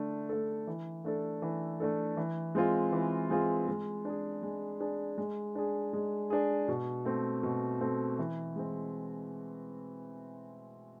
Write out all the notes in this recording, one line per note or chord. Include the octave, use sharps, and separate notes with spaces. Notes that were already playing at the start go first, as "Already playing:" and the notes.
Already playing: D3 A3 D4
A3 D4 A4
E3
A3 D4 A4
E3
A3 D4 A4
E3
G#3 C4 F4 G#4
E3
G#3 C4 F4 G#4
G#3
D4 G#4
G#3
D4 G#4
G#3
D4 G#4
G#3
D4 G#4
B2
A3 C4
B2
A3 C4
E3
G#3 C4